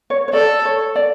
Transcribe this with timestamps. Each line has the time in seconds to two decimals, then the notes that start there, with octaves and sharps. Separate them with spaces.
0.10 C#5
0.28 C#5
0.33 A4 D5
0.65 C#5
0.96 D5